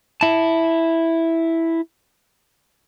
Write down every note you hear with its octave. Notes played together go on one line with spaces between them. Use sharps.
E4 A5